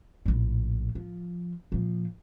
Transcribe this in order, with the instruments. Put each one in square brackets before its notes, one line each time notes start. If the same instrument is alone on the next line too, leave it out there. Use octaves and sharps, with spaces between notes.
[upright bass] A#1 A2
F3
A#2 F3